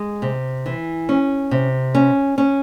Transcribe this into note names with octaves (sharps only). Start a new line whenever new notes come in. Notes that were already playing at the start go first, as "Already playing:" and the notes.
Already playing: G#3
C3
E3
C#4
C3
C#4
C#4